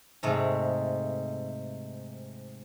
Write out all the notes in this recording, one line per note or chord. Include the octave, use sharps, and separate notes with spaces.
G#2 C3 G#3 A3